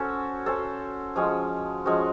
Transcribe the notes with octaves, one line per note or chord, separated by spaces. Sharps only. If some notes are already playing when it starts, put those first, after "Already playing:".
Already playing: C#4 F#4 A4 C5
C#4 F#4 A4 C5
F3 G#3 C#4 F#4
F3 G#3 C#4 F#4